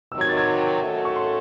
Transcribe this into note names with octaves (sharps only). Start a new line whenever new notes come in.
C3 D#3 F#3 E6
G#6
A6
G#6
D#3 A3 C#4 F#4 A4
C#6
C6